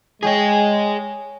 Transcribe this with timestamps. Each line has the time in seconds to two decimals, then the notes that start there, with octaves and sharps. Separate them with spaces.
0.23 G#3 G#4 C#5 D#5 G5 G#5